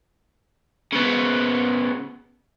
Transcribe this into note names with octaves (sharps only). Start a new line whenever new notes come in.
C#3 B3